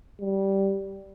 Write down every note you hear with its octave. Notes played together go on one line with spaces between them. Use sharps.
G3